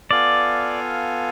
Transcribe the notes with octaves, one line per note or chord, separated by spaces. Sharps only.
B3 F4 A4 D5 F5 G#5